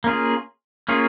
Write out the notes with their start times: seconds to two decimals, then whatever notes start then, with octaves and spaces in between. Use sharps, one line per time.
0.04 A#3 C#4 F4 G#4
0.89 A#3 C#4 F4 G#4